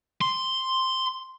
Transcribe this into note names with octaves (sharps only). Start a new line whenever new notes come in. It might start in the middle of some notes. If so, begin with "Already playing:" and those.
C6